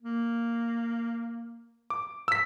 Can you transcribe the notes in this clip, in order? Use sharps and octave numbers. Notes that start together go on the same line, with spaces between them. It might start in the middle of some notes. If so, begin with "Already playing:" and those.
A#3
D6
E6 B6